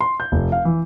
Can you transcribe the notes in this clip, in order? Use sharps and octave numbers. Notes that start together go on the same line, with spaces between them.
C6
G6
F1
F5
E3